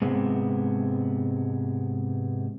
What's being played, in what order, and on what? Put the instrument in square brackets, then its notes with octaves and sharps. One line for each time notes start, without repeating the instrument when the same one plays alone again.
[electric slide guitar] G#2 C3 G#3 B3 C4